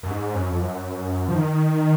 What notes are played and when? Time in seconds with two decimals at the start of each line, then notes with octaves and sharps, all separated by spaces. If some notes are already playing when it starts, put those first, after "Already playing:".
0.03 F#2
0.10 G#2
0.35 F#2
0.49 F2
0.62 F#2
1.29 F3
1.34 D#3